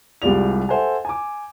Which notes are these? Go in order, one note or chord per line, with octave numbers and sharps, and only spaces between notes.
C2 G3 G#3 F4 D5 F7
A4 C5 E5 F#5 G#5
G#5 D6